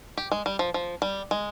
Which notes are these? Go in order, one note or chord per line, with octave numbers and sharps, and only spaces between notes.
G4
G#3
G3
F3
F3
G3
G#3